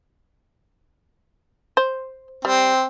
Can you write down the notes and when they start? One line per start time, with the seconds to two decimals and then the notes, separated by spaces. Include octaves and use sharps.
1.77 C5
2.45 G3 C4